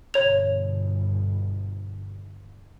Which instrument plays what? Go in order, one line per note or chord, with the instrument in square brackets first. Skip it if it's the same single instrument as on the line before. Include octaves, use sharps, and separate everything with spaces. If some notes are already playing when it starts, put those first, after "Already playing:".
[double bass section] G1 B2 [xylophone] C#5 F7